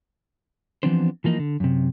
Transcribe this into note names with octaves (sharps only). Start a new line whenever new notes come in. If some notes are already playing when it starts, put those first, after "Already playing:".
E3 F3 B3 C4 D4 C5
E3 F3 A#3 B3 D#4
D3
F#2 C3